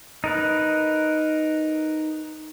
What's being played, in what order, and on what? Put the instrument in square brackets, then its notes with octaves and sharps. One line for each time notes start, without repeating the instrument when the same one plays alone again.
[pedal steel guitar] D#4 A#4 B4